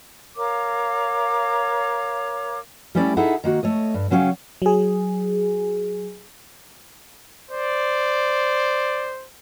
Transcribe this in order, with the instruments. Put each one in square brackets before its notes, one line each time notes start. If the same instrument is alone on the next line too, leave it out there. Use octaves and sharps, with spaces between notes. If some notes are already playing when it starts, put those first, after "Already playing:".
[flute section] A#4 C#5 F5 D6
[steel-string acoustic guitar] G3 A3 C#4 E4 D5 G5
D#4 E4 G#4 A4 E5 F#5
D#3 A#3 F#4
A3 C#5 D#5
G2
C#3 F#3 C#4 C#5 F5 G5
[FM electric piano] F#3 G#4
[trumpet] C5 [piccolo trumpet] D5